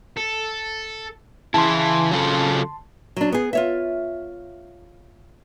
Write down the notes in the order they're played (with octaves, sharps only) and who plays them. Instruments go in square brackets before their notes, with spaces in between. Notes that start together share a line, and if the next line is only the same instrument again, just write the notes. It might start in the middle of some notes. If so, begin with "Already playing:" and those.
[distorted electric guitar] A4
[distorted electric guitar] C#3 [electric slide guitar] E3 E4 [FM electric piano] A5 C6
[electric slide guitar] F#3 F4 A4
[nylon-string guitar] F#3 D4
B3 G#4
F4 C#5 E5